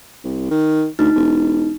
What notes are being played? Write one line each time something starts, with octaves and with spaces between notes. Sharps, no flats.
C2
D#3
D2 D#4
E1